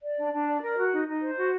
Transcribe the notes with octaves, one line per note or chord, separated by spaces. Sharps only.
D5
D4
D4
D5
A#4
F#4
D#4
D#4
C5
F#4